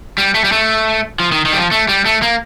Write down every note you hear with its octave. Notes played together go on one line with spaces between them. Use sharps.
G3
A3
G3
A3
F3
D#3
D#3
G3
F3
A3
G3
A3
A#3